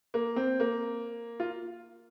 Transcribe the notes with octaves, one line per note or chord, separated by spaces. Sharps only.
A#3
C4
A#3
F4